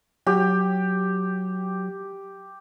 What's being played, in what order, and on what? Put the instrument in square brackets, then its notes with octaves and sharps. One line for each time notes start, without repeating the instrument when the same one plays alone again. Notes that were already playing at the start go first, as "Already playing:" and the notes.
[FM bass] F#3 [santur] G4